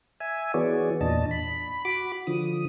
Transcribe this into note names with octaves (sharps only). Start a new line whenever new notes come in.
E5 G#5
E3 B3 F#4 G#4 C#5 D5
E2 A#2 D4 D#5 A5
B5
F#4 B5 D6
D3 F3 D#6